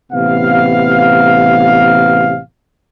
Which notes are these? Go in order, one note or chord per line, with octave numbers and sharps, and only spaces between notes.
A1 C3 B3 F5